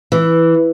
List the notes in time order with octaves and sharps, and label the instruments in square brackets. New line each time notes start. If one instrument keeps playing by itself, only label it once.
[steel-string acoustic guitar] E3